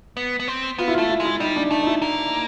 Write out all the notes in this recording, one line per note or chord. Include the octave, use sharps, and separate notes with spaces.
B3
B3
C4
B3 F4
E4
A3 F4
E4
G#3
E4
G3 D#4
D4
A3 D#4
D#4
E4
A#3